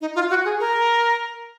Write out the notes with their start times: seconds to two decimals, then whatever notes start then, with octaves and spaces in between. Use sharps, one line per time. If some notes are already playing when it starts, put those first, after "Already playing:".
0.01 D#4
0.15 F4
0.30 F#4
0.45 G#4
0.60 A#4